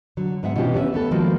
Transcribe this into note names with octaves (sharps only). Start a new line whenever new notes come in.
D3 F#3
G#2 G#3 B3 E5 F#5
B2 E3 C#4 D4 F4 G4
B3 C#4 D5 E5
A3 B3 A4
D#3 F3 G#3 A#3 D4 F#4